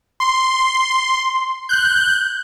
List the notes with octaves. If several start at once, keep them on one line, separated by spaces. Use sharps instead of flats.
C6
F#6 G6